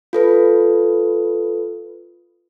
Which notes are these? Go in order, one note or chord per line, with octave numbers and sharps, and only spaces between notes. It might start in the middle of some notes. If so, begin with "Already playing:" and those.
F4 A4 B4